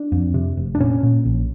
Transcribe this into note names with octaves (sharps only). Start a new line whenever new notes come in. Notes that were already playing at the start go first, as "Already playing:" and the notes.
Already playing: D4
F2
C3
F1
D4
A#2 C#4
A#2
A#1